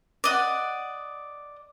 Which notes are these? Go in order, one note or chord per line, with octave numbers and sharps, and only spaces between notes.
D5 D#5 F#5